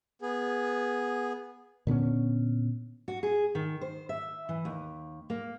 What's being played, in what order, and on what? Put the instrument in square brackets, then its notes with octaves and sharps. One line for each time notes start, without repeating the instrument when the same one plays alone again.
[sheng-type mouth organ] B3 G#4
[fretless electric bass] A#2 D3 B3 C#4
[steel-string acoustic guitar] F#4
G#4
D#3
C5
E5
E3
D#2
A#3